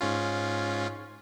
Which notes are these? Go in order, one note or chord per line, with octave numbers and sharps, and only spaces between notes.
G#2 C#4 F4